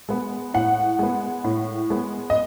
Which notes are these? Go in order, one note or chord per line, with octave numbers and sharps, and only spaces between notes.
G#3 B3
A2 F#5
G#3 B3
A2
G#3 B3
D#5